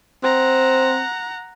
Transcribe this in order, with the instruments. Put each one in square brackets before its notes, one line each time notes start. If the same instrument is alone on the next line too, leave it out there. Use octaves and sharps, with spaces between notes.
[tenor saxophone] C4 [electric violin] F#5 A#5